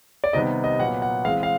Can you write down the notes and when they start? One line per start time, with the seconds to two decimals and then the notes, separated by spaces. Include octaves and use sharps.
0.24 D5
0.33 C3 D#3 G3 B3 D#5
0.64 D#5
0.79 A#2 F#3 B3 F#5
1.02 F#5
1.25 E3 G#3 C4 F5
1.43 F5